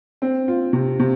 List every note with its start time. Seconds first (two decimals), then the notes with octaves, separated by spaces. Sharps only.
0.22 C4
0.48 F4
0.73 C3
0.99 C3